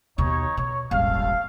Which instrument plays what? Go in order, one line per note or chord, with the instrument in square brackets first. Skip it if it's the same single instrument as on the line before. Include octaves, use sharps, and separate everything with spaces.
[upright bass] D#2 B2 [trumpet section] D#4 C#5
[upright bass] B2 [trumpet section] C#5
[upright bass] D#1 G#1 [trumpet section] A3 F5